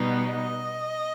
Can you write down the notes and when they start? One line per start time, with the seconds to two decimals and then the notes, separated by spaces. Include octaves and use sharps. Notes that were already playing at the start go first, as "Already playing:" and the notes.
Already playing: B2 G3 B3 D#4
0.22 D#5